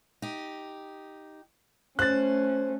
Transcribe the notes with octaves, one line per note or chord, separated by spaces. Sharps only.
D#4 G4
A3 C#4 C5 F#6 A6